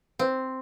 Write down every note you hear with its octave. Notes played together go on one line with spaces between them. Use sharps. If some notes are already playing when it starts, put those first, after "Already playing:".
C4